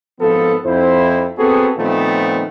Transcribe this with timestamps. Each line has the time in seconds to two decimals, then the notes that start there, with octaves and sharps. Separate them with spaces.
0.21 G#1 F3 B3 A4
0.66 F2 E4 C5
1.38 B3 C4 F#4 G#4 A4
1.78 A#2 D#3 F3 A3 B3 C4